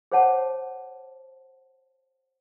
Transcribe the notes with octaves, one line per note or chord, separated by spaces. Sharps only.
G#4 C5 C#5 F#5 A5